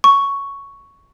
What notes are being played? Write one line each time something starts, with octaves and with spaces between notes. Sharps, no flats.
C#6